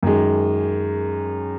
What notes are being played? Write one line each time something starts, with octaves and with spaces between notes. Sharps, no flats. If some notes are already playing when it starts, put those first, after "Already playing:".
F#2 D#3 G#3